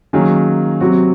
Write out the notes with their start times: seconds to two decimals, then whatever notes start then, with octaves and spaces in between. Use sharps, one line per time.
0.13 D#3 F#3 A#3 C#4 G#4
0.80 C3 F#3 C4 F#4